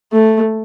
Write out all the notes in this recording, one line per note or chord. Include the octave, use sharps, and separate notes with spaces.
A3